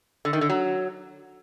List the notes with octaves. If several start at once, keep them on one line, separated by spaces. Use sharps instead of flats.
D3
D#3
D3
F#3